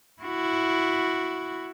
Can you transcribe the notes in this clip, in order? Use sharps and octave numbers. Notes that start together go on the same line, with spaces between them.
E4 F#4